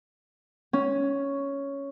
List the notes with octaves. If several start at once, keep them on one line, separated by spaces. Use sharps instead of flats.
C#4